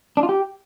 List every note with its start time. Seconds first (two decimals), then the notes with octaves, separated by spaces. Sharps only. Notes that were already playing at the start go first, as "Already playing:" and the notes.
0.17 D4
0.23 F4
0.29 G4